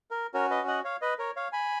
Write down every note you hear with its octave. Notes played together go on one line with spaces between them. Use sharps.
A#4
C#4 F#4 A#4 C#5
B4 D#5
D#5 F#5
C#5 F5
B4 D#5
A#4 C#5
C#5 F5
G#5 B5